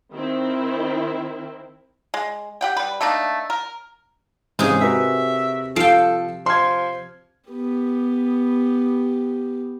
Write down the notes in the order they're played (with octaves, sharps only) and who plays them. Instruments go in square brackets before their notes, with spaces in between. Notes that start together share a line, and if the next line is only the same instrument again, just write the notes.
[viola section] D#3 C4 E4
[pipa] G#3
G4 F#5 G5
G3 B4
A3 A#3 D4 D#4
A#4
[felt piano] G#2 E3 C#4 [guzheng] C3 D#4 G#4
[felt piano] F#4 A#4 B4 [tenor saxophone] E5
[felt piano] F3 C7 D7 [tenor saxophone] A4 [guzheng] F5 G5
[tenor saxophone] F3 [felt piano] C6 F6 G#6
[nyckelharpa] B3 G4